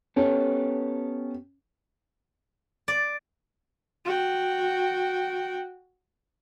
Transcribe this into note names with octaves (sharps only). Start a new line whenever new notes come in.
B3 C#4 G4 A4
D5
F#4 G5